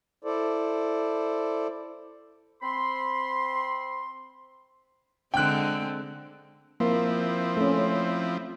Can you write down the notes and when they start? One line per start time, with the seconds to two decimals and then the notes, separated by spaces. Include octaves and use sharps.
0.24 E4 A4 C5 D5
2.63 C4 B5 C6
5.34 D3 G#3 C4 G5 F#6
6.80 F3 A#3 C4 E4
7.57 A3 C#4